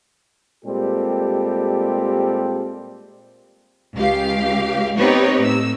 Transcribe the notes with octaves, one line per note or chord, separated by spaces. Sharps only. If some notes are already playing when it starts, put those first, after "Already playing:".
A#2 G3 G#3 C4 G4 A4
C#2 G4 F5
B3 C4 D#4 G4 B4 C#5
A2 E6